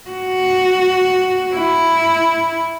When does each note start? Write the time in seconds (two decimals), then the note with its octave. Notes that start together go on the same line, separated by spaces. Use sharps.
0.10 F#4
1.55 E4